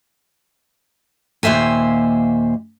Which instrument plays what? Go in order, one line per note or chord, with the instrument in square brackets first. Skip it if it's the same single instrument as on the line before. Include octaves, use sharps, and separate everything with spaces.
[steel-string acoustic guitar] D#2 A#2 C5 E5 G#5